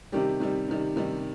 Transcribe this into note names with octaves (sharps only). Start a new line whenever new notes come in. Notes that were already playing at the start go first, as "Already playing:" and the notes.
C3 D#3 G3 G4
C3 D#3 G3
C3 D#3 G3
C3 D#3 G3